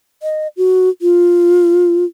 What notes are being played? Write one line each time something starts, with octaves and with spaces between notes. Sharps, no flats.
D#5
F#4
F4